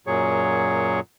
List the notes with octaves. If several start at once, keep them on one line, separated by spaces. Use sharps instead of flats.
F#2 A#2 F#3 G#4 C#5